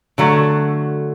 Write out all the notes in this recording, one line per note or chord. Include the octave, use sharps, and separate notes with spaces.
D3 F#3 A3